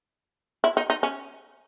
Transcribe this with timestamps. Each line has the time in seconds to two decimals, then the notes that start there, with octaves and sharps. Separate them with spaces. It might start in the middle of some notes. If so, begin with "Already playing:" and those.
0.64 E4
0.77 D#4
0.90 D#4
1.03 C#4